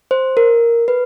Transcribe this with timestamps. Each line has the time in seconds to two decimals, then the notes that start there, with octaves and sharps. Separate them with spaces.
0.11 C5
0.37 A#4
0.88 B4